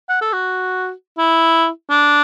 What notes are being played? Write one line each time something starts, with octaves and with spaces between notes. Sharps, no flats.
F#5
A4
F#4
E4
D4